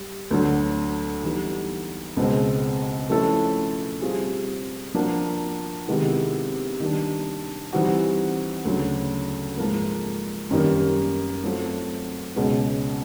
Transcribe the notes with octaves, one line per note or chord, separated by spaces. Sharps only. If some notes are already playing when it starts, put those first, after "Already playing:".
Already playing: G3
D2 D3 F#3
E3 G3 B3 D#4
C#2 B2 G#3 C4
F3 A3 C#4 E4 A4
G3 C4 F4 G#4
F3 A#3 D4 F#4
C3 D#3 G#3 B3 E4
D#3 G3 A#3 D4
E3 G3 C4 D#4 F#4
D2 C#3 F#3
G#2 F3 A#3
F#2 D#3 G3 A#3 D#4
F#3 A3 C4 F4 A4
C#2 B2 G#3 C#4 F#4